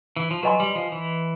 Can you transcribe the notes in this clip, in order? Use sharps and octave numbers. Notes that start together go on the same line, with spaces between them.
E3
F3
F#3 B4 D#5 G#5 C6
G3
F3
E3